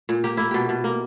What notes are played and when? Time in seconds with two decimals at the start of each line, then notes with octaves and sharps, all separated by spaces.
0.09 A#2
0.24 A#3 G4
0.37 A#3 E4
0.51 B2 G4
0.69 B2
0.84 A#3